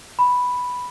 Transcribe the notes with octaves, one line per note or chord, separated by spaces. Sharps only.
B5